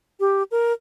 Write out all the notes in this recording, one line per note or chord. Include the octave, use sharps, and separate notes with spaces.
G4
A#4